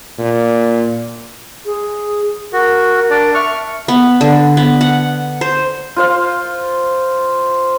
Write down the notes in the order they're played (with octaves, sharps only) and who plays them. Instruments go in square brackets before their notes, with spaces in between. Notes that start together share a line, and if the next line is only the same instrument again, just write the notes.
[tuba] A#2
[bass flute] G#4
[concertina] F#4 [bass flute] A#4
[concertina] D4 D5
[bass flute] E5 [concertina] C#6 F6
[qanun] B3
D3
B3
F#5
C5
[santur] F4 C5 F5